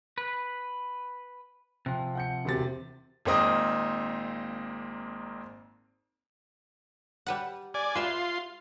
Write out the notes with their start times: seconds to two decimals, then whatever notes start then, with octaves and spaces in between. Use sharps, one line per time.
0.18 B4
1.86 C3 F3 G5
2.15 F#5 G6 C#7
2.45 E1 C3 A6
3.25 G#1 A#2 A#3 C4 D#5 D#6
7.26 G3 B4 F#5
7.74 D5 G#5
7.95 F4 B4 E5 C6